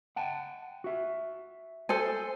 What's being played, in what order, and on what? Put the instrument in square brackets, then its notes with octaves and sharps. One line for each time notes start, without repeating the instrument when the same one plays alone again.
[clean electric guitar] F#5 G5 A5
F#4 E5
[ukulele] A4 C5 G#5